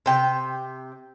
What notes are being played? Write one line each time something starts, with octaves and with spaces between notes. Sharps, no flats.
C3 G5